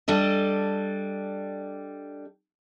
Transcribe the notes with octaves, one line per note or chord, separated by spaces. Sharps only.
G3 D4 A4 D#5